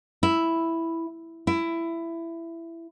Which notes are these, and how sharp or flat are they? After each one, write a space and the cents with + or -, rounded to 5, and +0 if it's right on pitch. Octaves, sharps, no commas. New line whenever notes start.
E4 +0
E4 +15